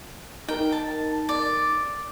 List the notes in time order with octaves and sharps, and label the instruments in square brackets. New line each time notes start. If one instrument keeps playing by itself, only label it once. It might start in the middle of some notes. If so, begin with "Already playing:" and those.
[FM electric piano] D#4 A#4 [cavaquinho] G5
[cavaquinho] A5
D5